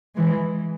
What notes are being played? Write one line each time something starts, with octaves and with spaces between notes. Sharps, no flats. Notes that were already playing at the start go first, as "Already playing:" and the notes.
E3 G#3